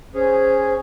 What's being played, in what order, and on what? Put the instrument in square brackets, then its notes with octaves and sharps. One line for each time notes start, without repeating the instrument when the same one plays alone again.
[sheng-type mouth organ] C#4 G#4 [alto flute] C5